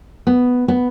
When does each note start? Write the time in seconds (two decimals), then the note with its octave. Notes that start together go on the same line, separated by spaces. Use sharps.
0.27 B3
0.68 B3